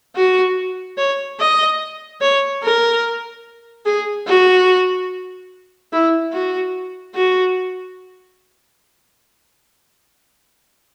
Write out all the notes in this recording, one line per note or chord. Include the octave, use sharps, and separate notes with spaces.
F#4
C#5
D#5
C#5
A#4
G#4
F#4
E4
F#4
F#4